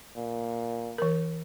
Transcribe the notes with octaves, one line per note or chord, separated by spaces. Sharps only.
A#2
E3 A#4